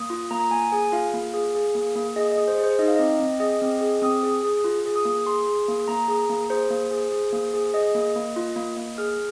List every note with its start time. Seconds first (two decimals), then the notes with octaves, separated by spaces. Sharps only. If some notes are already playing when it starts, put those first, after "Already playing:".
Already playing: A#3 D#6
0.10 F4
0.31 A#3 A#5
0.51 A#3 G#5
0.72 G#4 G#5
0.92 F4 F5
1.14 A#3
1.34 G#4
1.55 G#4
1.75 A#3
1.95 A#3
2.16 G#4 D#5
2.31 D#5
2.38 G#4
2.48 C5
2.58 G#4
2.64 C5
2.79 D#4 D#5
2.88 F5
2.96 C4 D#5
3.20 C4
3.40 G#4 D#5
3.62 C4
3.81 G#4
4.02 C4 D#6
4.23 G#4
4.43 G#4
4.64 F4
4.86 G#4
4.96 D#6
5.05 A#3
5.26 G#4 C6
5.47 G#4
5.68 A#3
5.88 A#3 A#5
6.08 G#4
6.30 A#3
6.50 G#4 C5
6.71 A#3
6.91 G#4
7.12 G#4
7.33 A#3
7.53 G#4
7.74 G#4 D#5
7.95 A#3
8.16 A#3
8.36 F4
8.56 A#3
8.77 A#3
8.98 G#4 F6